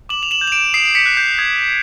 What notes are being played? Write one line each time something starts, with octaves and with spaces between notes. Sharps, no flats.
D6 E7 F#7
F7
E7 F#7
G6
F7
D7 E7
D#6 C7 D7
D7
B6 C#7
F#6
G6
D#6 G#6